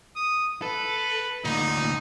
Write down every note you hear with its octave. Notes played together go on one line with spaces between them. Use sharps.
D#6
A4 B4
D2 A#2 D#4